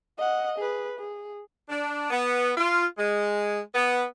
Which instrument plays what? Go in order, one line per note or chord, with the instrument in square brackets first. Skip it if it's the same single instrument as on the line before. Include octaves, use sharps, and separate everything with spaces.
[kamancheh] D#5 F#5
G#4 B4
G#4
[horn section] D4
B3
F4
G#3
B3